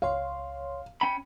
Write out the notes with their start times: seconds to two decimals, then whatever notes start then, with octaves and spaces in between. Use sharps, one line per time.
0.02 C#2 C#5 F5 C6
1.01 C#4 G5 B5